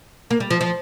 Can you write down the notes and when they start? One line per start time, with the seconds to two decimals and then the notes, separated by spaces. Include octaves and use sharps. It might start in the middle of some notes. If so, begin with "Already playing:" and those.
0.31 A#3
0.40 G3
0.50 F3
0.61 F3